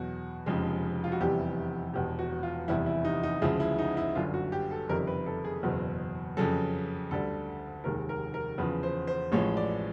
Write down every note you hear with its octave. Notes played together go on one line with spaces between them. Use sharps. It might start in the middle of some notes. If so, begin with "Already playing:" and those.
Already playing: E2 B2 F#3 F#4
F1 F2 C#3 F3 G#3
F4
F#4
F1 E2 C3 E3 G3 G4
E1 E2 B2 G4
F#4
F4
F1 E2 C3 E3 G3 E4
E4
D#4
D#4
D2 C#3 F3 G#3 E4
E4
D#4
E4
G1 F#2 D3 F4
F#4
G4
A4
F#1 F2 C3 D#3 G3 A#4
B4
A4
G#4
F#1 E2 B2 F#3
F2 C#3 F#3 A4
D2 D3 G3 A4
F1 D#2 D#3 G#3 A#4
A#4
A#4
E2 C#3 F3 B4
C5
C5
A1 A2 F3 G#3 C#5
D5